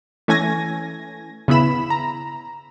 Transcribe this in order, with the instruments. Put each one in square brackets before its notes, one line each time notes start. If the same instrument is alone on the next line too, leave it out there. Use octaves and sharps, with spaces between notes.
[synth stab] E3 A3 C#4 G#5 G#6 A#6
C#3 B3 E4 B5 E7
A#5